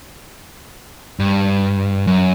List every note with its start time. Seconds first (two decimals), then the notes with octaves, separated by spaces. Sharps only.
1.20 G2
2.07 F#2